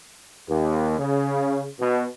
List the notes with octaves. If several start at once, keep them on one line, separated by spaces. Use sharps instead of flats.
D#2
C#3
B2